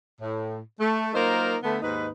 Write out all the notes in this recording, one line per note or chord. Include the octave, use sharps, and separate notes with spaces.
A2
A3
F#3 A#3 D#4 F4 A#4 C5
D3 A3 B3
D#2 G#2 D#4 B4